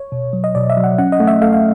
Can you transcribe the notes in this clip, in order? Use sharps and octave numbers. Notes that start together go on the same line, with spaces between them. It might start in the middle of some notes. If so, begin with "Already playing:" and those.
Already playing: C#5
B2
F#3
D#5
B2 D5
E5
F#3
F#5
C#4 F#5
D#5
A3
E5
A3 F5
F5